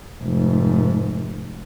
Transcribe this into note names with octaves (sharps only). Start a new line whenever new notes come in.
F1 G#2